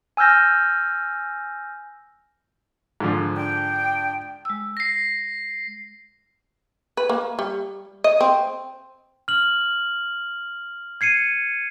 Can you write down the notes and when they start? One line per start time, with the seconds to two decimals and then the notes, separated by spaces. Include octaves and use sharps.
0.17 G#5 E6 F6 G6 A#6
3.00 G#2 D3 F3
3.36 D4 G5
4.45 G#3 E6
4.77 A#6 C7
6.97 B4
7.09 A#3
7.39 G3
8.04 D#5
8.21 C4
9.28 F6 F#7
11.01 G#6 C7 C#7 D#7